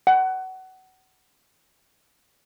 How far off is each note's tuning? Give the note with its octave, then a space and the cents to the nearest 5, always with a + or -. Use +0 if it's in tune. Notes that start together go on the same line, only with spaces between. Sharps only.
F#5 +25